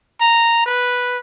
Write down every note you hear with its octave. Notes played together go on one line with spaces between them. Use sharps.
A#5
B4